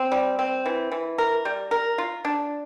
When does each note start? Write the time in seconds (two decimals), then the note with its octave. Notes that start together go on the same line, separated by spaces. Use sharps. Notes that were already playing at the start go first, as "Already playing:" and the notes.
Already playing: C4
0.12 G3
0.39 C4
0.66 E3
0.92 E3
1.18 A#4
1.45 G3
1.71 A#4
1.98 F4
2.25 D4